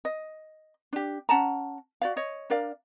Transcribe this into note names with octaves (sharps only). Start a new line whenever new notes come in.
D#5
D4 G4
C#4 F#5 A5 A#5
F#4 D5 F5
C#5 D#5
D4 A#4 D5 F5